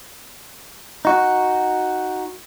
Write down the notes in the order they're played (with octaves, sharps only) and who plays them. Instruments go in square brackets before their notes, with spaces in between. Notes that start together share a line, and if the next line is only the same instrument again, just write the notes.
[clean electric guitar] D#4 F#4